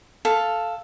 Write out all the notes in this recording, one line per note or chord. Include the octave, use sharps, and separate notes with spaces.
A4 F5